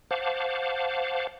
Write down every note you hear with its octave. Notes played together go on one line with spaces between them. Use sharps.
C5 F5 F#5 A5 D6